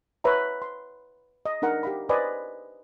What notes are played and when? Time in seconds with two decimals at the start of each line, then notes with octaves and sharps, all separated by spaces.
0.24 B4 C#5 E5 A#5
0.62 C6
1.45 D#5
1.62 D4 D#4 A#4 F#5
1.83 G4 F5 B5
2.09 B4 C5 D5 D#5 G#5 B5